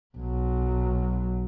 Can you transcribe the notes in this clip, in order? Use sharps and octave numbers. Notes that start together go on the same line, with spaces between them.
B1 F#3